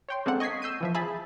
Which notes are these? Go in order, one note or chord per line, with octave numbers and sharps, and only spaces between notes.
C#5 G5 C6
G#3 A#3 C4 D4 A4 F#5
D#5 C#6 G#6 B6 C7
E6 G6 C7 D#7
E3 F3 E5
G#4 E5 A5 B5